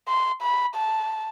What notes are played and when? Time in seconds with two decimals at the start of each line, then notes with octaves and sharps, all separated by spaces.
0.08 C6
0.42 B5
0.75 A5